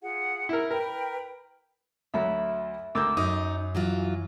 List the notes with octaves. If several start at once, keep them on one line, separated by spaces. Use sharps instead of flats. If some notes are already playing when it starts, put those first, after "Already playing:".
F4 G#4 F#5
E4 A#4
A#4 B4 G5 B5
D2 F#3 E5 B5
D2 A#4 D6 E6 G6
F#2 D#4 D#6
E3 F#3 F4